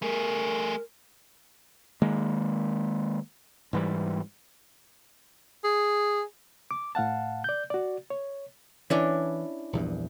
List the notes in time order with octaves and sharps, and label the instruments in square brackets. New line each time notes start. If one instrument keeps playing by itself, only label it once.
[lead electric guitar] A3 G#4 [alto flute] A#4
[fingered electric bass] D#3 G#3 A#3
G#2 E3 G3
[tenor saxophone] G#4
[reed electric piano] D6
A2 F5 F#5 A5
D5 G6
F#4 D5
C#5
[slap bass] E3 [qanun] C#4 D4 E4
[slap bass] A#1 E2 G2